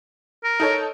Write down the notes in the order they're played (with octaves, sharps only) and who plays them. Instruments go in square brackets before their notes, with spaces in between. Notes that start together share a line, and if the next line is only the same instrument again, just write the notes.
[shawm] A#4
[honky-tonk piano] D#4 A4 C#5